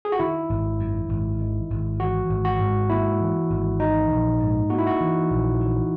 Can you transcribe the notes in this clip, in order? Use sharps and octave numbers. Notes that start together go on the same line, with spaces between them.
G#4
F#4
D#3 E4
G#1
F#2
G#1
D#3
G#1
E3 F#4
G#1
F#4
G#2
A#3 E4
E3
G#1
E3 D#4
A#1
G#2
A#3 F#4
E4
F#4
E3
A#1
E3